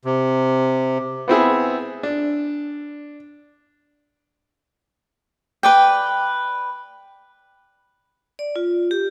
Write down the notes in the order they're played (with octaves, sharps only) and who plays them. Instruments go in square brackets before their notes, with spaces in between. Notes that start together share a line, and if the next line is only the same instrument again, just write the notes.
[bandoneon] C3
[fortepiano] B3 C4 E4 G#4
D4
[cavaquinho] B4 D5 G5
[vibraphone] D5
F4
G4